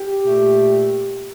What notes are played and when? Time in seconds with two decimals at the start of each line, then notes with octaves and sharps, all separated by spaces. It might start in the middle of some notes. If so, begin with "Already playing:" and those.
Already playing: G4
0.24 A#2 A3